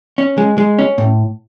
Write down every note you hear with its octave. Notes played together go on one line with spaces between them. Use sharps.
C#4
G#3
G#3
C#4
A2